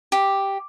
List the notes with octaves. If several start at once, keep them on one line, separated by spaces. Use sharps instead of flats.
G4